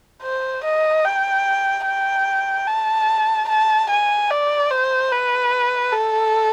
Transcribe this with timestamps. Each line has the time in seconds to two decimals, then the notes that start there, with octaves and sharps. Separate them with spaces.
0.23 C5
0.64 D#5
1.05 G5
1.86 G5
2.67 A5
3.49 A5
3.90 G#5
4.30 D5
4.71 C5
5.12 B4
5.93 A4